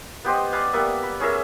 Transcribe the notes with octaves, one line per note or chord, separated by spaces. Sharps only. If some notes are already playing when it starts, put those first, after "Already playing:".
B3 G4 C5 D#5
B4 D5 F5 G#5
G3 A#3 B3 E5
B5
C#4 G#4 A#4 E5